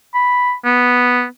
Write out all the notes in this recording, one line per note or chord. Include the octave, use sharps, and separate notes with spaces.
B5
B3